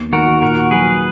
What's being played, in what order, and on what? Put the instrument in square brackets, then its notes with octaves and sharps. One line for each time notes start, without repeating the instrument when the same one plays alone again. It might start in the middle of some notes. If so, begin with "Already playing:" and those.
Already playing: [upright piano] D#2 B3
[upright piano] D#3 [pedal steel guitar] F#4 A#4
[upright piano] A#2 [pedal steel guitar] F#4 A#4
[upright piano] F#3 [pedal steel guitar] G#4 B4